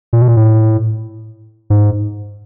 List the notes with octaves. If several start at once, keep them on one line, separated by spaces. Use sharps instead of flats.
A#2
B2
A#2
A2
G#2